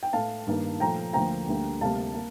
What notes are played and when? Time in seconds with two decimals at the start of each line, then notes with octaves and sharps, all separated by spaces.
0.03 G5
0.13 A2 A3 F5 A5
0.47 G2 D#3 A#3
0.80 A#2 F3 A3 G5 A#5
1.13 D2 D3 F3 A#3 G5 A#5
1.47 D2 D3 G3 A#3
1.81 D2 C3 G3 A#3 F5 A5
2.14 A#3